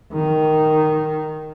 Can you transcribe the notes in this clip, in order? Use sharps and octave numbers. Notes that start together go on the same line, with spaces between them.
D#3